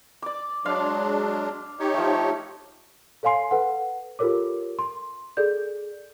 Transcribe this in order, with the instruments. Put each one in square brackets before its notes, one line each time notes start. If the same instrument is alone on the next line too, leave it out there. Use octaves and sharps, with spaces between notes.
[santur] D5 D6
[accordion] F#3 G#3 D4 [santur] D5 F5 C6
[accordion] D#4 G4 C#5
[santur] F3 A3
[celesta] A4 C#5 F5 G#5 C6 C7
A4 B4 F#5
F4 G4 A4 A#4 C#5 D6
C6
G#4 A4 D5 G6